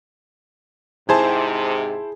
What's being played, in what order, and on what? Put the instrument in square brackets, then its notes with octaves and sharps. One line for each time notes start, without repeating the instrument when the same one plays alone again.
[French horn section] G#2 C3 [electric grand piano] E4 C5 A5 [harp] G#4